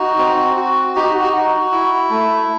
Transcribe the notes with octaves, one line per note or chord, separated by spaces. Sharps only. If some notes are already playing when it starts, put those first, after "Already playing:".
Already playing: D#4 F#4
C4
F#4
D#4 G4
F#4
F#4
F#4
E4
A3